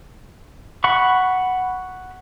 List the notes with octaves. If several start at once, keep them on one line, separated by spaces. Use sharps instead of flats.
F#5 B5 C#6